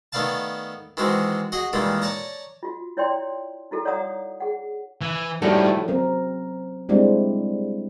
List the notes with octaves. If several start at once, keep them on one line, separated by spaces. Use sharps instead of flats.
D#3 A3 B3 D5 F5 A5
D#3 E3 G#3 C4 F#4
F#4 G#4 D#5 F#5
A#2 D#3 E3 G3 G#3
C#5 D5 A5 A#5
F4 F#4
E4 C#5 D5 G5 C6
D#4 E4 F#4 A4
C#5 D5 F5 F#5 A#5 D#6
G#4 F#5
E3
A2 D#3 F3 G3 F#4 A4
F#3 C4 A#4
G3 G#3 C4 D4 E4